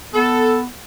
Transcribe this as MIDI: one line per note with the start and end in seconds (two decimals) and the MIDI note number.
0.13 0.67 59
0.13 0.56 69